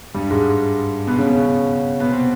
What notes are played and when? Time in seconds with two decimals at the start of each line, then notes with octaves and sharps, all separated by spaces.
0.14 G2 G3
0.31 G#2 G#3
1.07 B2 B3
1.19 C#3 C#4
1.30 C#3 C#4
2.00 B2 B3
2.12 C3 C4